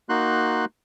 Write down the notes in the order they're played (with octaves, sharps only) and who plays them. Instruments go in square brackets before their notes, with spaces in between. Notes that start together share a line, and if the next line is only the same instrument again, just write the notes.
[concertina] A#3 D#4 F#4 C6 F#6